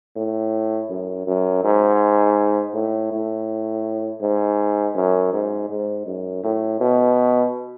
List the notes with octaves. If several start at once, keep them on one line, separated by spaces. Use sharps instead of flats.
A2
F#2
F#2
G#2
A2
A2
G#2
F#2
G#2
G#2
F#2
A2
B2